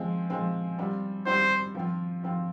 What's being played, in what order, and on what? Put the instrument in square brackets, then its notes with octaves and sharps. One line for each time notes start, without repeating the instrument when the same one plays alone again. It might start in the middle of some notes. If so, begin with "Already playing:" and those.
Already playing: [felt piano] F3 G#3 C4
F3 G#3 C4
G3 C4 F4
[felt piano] G3 C4 F4 [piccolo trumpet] C5
[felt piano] F3 C4 F4
F3 C4 F4